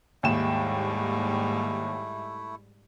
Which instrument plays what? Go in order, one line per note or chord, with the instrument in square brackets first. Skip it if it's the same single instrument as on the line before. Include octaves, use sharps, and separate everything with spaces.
[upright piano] D#2 G5 E7 [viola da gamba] G#2 G3 [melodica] A3 E4